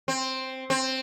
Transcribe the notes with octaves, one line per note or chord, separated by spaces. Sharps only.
C4
C4